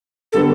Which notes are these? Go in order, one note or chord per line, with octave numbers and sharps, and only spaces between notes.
D3 G3 B3 A4